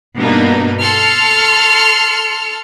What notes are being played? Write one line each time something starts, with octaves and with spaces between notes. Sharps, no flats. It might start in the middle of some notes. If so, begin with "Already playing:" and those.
G2 B2 A#3 B3 D4 D#4
A4 C6 F6 C#7